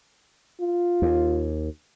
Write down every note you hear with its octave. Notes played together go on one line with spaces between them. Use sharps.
F4
D#2